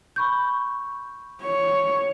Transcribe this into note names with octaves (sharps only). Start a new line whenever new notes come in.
B5 C#6 G6
C#5